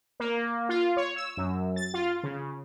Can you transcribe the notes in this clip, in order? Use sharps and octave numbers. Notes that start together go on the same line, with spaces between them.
A#3
F4
C#5
E6
F#2
A6
F4
C#3